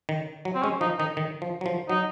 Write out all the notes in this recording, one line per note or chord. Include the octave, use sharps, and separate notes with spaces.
D#3
F#3
C4
G#3 C#4
F3 D#4
D#3 D#4
D#3
F3
F#3
F3
F#3 D#4